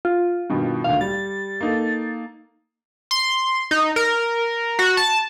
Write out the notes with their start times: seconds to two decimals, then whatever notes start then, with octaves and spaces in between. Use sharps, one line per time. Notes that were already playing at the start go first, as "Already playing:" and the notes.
0.05 F4
0.50 G2 B2 D#3
0.84 D2 A#2 D#3 F5
1.01 G3 A6
1.61 A#3 D#4 A4
3.11 C6
3.71 D#4
3.96 A#4
4.79 F#4
4.97 A5